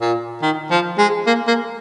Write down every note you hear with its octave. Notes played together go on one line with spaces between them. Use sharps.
A#2
D#3
F3
G#3
A#3
A#3